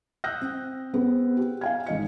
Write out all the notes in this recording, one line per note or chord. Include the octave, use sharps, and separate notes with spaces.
D#6 E6 F#6 G6 A#6
C4
B3 C4 G#4 C5
G4
F5 G#5 G#6
G#1 D#5 C#7